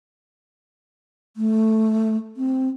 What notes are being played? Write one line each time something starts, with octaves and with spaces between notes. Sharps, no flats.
A3
C4